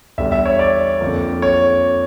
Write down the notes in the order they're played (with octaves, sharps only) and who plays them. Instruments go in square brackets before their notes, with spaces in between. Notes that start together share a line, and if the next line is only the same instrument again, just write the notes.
[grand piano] E2 D3 G3 E5
E5
C#5
D5
F2 D3 F3 A#3
C#5